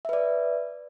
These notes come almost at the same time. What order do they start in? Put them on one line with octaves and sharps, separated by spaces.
E5 B4 D5